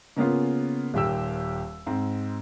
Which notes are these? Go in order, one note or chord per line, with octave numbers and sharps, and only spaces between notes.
C#3 A#3 B3 C#4 F4
D#1 D#2 G4 E6
G#2 C4